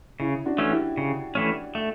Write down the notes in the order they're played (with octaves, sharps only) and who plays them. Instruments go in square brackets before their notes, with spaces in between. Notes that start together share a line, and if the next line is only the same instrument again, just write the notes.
[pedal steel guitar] C#3 [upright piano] C#4 E4
[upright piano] D4 F#4
[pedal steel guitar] E3 A3 C#4
[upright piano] E4 G4
[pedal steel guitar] C#3
E3 A3 C#4
A3